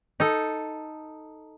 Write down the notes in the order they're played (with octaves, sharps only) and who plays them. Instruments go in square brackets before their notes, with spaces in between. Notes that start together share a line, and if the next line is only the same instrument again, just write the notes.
[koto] D#4 A4